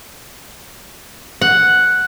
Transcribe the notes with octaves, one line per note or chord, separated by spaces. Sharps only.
F#5